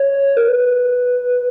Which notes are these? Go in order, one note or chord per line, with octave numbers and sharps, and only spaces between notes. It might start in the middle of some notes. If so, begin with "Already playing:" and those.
Already playing: C#5
A#4
B4